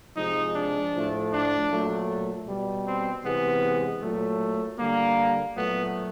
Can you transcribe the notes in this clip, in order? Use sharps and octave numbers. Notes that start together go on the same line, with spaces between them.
C3 F3 G#3 D#4
D4
A2 F3 A3
D4
A#2 F#3 A3
B2 G3
C4
C3 E3 G#3 B3
A#2 F#3 A3
D3 G3 A#3
A#2 F#3 A3 B3